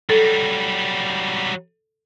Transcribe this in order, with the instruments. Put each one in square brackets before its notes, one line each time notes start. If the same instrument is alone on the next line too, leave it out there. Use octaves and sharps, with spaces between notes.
[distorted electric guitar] F#3 G3 [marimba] A4